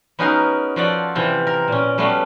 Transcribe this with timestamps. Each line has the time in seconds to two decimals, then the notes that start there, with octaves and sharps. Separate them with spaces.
0.19 B3 C#4 D#4 F#4 G#4 A#4
0.76 F3 F4 F#4 A4 D5
1.15 C3 E3 C4 F4
1.47 A#4
1.68 A#2 C#4
1.98 G3 A3 B3 C#4 F#4 F5